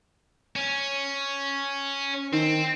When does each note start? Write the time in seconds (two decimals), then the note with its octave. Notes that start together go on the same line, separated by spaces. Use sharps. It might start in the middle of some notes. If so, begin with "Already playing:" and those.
0.56 C#4
2.33 D#3 C4